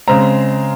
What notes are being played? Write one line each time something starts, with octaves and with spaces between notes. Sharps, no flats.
C#3 G#3 C4 A#5